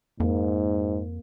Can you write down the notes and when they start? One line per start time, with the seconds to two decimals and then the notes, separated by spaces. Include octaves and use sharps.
0.20 F2 G#2 A#3